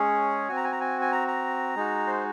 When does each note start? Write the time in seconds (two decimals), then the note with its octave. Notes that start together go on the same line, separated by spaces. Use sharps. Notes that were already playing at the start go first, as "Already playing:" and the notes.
Already playing: G#3 C#4 G#4 C#5
0.48 C4 F#4 G#5
0.56 A#5
0.64 G#5
0.72 A#5
0.80 G#5
1.01 G#5
1.12 A#5
1.28 A#5
1.76 G#3 D#4 F#4
2.07 C5